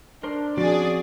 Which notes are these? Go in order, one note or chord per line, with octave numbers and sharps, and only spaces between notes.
D4 A#4 C5 D5
F3 C4 C#4 F#4 G#4 D5